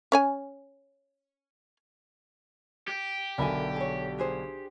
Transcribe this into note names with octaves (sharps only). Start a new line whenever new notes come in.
C#4 C#5 G#5
G4
B1 D3 A#4 E5 G#5 B5
G#4 C#5
D4 G#4 C5